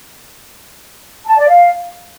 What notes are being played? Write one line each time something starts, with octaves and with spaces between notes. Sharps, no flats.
A5
D5
F5